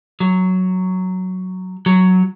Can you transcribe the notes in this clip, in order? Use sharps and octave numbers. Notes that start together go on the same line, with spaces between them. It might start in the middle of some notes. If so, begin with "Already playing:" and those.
F#3
F#3